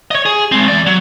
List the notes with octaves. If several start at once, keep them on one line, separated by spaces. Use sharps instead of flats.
C#5 D#5
G#4
G#3 C4
E2 D5
F#3